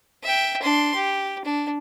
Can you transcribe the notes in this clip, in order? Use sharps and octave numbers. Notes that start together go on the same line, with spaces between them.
E5 G5
D4 C6
G4
D4